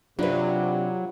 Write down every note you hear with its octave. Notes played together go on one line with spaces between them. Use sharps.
C3 F#3 D4 F4 B4 D5